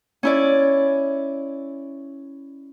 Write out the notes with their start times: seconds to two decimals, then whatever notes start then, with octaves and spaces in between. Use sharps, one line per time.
0.23 C#4 E4 D5